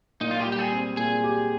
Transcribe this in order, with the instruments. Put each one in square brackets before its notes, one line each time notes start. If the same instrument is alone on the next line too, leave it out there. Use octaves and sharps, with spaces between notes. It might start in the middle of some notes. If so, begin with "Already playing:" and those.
[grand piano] A#2 [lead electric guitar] D#4
[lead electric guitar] F4
G4
[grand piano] G3
[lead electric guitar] G4
G#4
[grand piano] C4
[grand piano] A#2 [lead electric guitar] G#4
[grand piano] G4